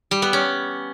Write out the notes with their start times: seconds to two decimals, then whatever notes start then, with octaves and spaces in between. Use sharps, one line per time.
0.11 G3
0.22 B3
0.33 C#4